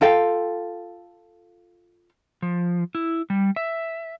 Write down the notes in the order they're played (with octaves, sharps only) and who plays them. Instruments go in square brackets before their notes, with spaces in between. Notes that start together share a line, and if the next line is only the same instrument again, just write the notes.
[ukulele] F4 A4 F5 G5
[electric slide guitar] F3
E4
G3
E5